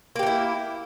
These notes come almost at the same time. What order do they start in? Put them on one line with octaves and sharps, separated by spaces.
A#3 G4 D#4 E4